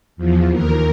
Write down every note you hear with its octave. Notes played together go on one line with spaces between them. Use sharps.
E2 F3
D#2 A#4